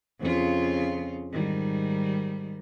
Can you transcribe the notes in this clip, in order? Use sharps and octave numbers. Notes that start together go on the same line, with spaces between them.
F2 C#3 F4
G#2 D#3 G3